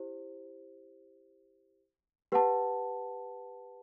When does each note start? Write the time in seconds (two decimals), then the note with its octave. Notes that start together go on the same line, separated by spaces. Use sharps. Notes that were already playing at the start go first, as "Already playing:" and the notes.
Already playing: E4 G4 C5
2.32 G4 B4 F#5 A5